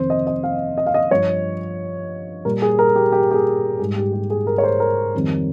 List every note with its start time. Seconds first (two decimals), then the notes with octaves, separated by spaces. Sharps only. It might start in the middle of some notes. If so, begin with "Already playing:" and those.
Already playing: F2 C3 D#3 C5
0.10 D#5
0.27 D#5
0.43 F5
0.78 D#5
0.86 F5
0.94 D#5
1.11 G2 F3 C#5
2.45 A#2 G3 A#4
2.62 G#4
2.79 A#4
2.96 G4
3.12 G4
3.31 G4
3.34 G#4
3.79 G#2 G3 G#4
3.96 G4
4.13 G4
4.30 G#4
4.47 A#4
4.58 C#5
4.64 C5
4.80 A#4
5.14 F2 D#3 G3